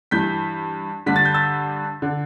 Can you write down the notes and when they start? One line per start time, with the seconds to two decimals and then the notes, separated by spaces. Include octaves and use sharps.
0.11 G2 E3 G6 B6
1.06 G2 D3 B6
1.16 A6
1.25 G6
1.34 E6 A6
2.02 D3